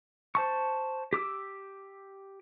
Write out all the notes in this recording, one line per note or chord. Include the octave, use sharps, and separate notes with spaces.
C5 A5 C#6
G4 D6 E6